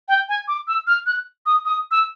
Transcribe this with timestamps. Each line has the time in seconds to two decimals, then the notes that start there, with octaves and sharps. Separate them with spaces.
0.08 G5
0.29 G#5
0.48 D6
0.68 E6
0.87 F6
1.06 F#6
1.46 D#6
1.65 D#6
1.91 E6